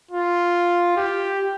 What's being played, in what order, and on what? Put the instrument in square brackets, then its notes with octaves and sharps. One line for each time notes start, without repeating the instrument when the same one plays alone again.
[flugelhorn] F4
G4